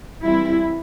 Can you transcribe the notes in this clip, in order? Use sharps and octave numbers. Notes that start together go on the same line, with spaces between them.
E3 G3 C4 E4